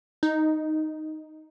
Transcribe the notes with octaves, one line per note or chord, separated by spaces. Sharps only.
D#4